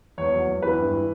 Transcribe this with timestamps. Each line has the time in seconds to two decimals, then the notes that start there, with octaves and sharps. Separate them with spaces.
0.18 E2 C#5
0.33 F#3
0.47 E2
0.62 E3 B4
0.78 G2
0.93 E3